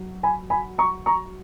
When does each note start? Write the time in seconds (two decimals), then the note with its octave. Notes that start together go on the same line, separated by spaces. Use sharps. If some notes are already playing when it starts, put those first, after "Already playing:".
Already playing: F#3
0.23 G#5 B5
0.50 G#5 B5
0.78 A#5 C#6
1.06 A#5 C#6